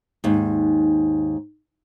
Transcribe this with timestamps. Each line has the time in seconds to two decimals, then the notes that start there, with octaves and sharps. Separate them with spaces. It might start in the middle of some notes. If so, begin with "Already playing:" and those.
0.24 D#2 G#2